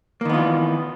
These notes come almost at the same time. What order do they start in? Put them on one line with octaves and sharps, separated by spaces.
A#3 D#3 B3 F4 E3